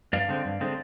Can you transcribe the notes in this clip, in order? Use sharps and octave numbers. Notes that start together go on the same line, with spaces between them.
G2 D5 F5
D3 G#3 C4
G2
D3 G#3 C4